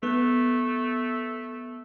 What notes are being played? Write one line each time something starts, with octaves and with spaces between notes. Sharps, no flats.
A3 B3